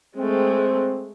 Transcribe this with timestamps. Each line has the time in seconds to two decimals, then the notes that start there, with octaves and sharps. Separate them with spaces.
0.17 G#3 A3 C4